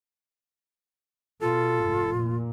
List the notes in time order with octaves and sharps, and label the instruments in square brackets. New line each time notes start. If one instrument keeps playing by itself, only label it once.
[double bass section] B2 [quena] F4 [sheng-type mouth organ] A4
[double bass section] F1 G#2
A#2